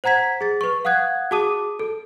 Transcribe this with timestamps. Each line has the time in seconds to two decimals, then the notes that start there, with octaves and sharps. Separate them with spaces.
0.04 C5 F#5 A#5 G#6 B6
0.41 G#4 A6
0.61 B4 C#6
0.85 F5 F#5 D#6 F#6 G#6
1.31 F#4 G#4 A5 D6 D#6 D#7
1.79 A4